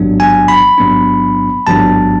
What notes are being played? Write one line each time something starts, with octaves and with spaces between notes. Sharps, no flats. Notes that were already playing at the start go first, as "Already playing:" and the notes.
Already playing: A1 G#2 F#3 B3 D4
G#5
B5
A1 G#2 F#3 B3 D4
A1 G#2 F#3 B3 D4 A5